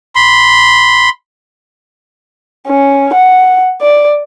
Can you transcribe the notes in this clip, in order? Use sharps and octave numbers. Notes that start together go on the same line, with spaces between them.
B5 C6
C#4
F#5
D5